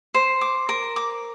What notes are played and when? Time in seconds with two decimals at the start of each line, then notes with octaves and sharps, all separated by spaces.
0.14 C5
0.41 D6
0.69 A#4
0.96 D6